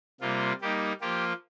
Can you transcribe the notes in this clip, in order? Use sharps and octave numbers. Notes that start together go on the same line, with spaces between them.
C3 G3 A#3 F4
G3 A#3 D#4 G4
F3 A#3 F4 G4